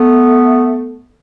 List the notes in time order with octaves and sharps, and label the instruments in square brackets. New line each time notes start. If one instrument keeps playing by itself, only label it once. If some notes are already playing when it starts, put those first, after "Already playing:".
Already playing: [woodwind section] A3 B3